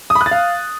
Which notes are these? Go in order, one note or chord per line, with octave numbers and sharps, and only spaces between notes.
D#6
B5
F#6
A6
F5